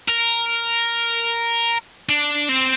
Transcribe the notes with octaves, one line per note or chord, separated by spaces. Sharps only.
A#4
D4
C4